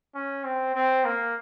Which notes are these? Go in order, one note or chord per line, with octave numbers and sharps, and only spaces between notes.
C#4
C4
C4
A#3